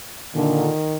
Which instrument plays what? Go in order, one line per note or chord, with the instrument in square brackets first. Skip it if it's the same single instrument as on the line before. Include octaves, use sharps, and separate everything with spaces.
[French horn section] A#2 D3 [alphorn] D#3